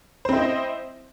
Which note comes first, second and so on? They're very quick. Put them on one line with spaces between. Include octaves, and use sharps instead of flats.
C5 C4 E4 D#5